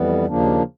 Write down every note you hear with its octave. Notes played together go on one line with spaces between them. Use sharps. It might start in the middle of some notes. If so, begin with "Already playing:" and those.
Already playing: F2 E3 G3 B3
D#2 C#3 F3 A#3 D4